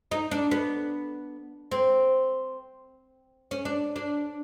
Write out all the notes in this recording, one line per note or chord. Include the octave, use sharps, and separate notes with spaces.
D#4
D4
B3
C4
C#4
D4
D4